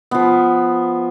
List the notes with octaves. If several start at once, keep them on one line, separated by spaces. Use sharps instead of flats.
F3 B3